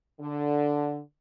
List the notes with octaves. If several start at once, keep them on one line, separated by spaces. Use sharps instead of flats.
D3